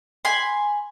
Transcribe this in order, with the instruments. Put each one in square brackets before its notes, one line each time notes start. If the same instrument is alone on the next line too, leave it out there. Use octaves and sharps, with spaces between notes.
[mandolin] G#5 B5 C6